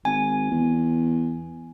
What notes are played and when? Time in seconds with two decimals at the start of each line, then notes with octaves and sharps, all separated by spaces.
0.05 G#1 G#5
0.51 E2